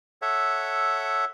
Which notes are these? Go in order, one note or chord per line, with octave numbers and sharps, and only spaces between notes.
A4 C#5 E5 F#5